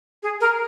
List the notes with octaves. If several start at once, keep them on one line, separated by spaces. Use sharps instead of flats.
G#4
A#4